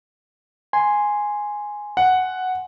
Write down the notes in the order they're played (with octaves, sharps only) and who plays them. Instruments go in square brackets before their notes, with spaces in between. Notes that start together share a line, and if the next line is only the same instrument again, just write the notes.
[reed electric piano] G#5 C6
[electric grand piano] F#5